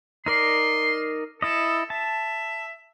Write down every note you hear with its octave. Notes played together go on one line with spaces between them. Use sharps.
D#4 A#4 D5 C6
E4 A4 D#5
E5 A5